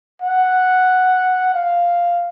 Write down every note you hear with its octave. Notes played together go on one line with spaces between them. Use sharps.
F#5
F5